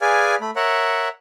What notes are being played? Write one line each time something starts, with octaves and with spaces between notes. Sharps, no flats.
G#4 B4 D5 F5 G#5
A3 B5
A#4 C#5 E5 F#5